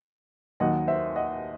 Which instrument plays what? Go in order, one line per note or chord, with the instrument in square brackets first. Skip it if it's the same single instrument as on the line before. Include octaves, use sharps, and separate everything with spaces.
[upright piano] D#2 D#3 F#3 D#5 F#5
C5 E5
D#5 F#5